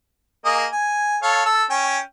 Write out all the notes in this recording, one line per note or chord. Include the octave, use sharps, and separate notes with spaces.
A#3 G#4 D#5
G#5
A4 C#5 F5
A4 E6
C#4 G5 G#5